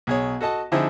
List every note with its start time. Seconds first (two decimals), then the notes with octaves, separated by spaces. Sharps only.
0.07 B1 G#4 C#5
0.41 F#4 A4 D#5 A5
0.72 D3 F3 C4 D#4 E4 G#4